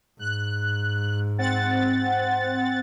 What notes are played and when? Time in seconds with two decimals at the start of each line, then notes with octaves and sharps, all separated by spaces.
0.19 G#2 F#6
1.39 C4 F#5 A6